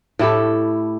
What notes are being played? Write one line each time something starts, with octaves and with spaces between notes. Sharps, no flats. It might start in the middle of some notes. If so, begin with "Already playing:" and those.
A2 E4 G4 A4